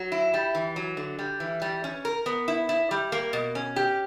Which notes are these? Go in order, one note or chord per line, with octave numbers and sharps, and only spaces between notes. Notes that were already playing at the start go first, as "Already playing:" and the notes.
Already playing: F#3
E4
G3
E3
F#3
D3
G3
E3
G3
C#4
A#4
B3
E4
E4
G3
A#3
B2
C#4
G4